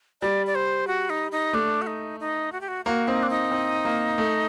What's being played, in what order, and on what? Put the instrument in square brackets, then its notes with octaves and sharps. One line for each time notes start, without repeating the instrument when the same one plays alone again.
[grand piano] G3 [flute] D5
[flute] D5
C5
F#4
D#4
D#4
[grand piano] A3 [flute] D4
[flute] F#4
D#4
D#4
F#4
G4
F#4
[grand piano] A#3 [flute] F#4
[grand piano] C4 [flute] D#4
[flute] D4
D#4
[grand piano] C4
A#3
A3